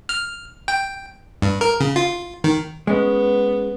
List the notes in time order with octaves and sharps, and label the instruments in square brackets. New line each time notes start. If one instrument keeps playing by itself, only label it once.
[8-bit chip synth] F6
G5
G2
A#4
C#3
F4
D#3
[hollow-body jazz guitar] G#3 C#4 [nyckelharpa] B3